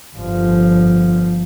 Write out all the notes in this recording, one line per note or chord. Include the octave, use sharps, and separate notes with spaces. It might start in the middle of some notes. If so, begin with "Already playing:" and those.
G1 F3